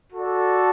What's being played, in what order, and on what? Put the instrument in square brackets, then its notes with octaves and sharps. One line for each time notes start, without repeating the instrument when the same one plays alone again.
[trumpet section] F#4 A4 D5